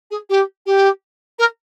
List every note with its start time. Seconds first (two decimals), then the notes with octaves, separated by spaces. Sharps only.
0.10 G#4
0.29 G4
0.66 G4
1.38 A#4